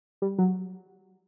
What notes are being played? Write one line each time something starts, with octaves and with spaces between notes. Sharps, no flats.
G3
F#3